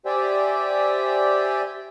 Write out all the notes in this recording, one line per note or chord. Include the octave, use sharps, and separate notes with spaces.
G4 C5 D5 E5 G5 G#5